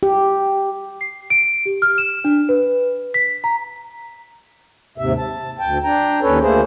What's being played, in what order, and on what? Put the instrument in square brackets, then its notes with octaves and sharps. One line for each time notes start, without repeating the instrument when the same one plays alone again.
[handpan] G4
[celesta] C7
D7
G4
F6
E7
D4
B4
B6
A#5
[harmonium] D#2 G#2 C3 E5
A5
D2 G5 A5
D4 G5 A#5
D#2 C#4 A4 B4 C#5
D2 A3 A#3 G#4 C5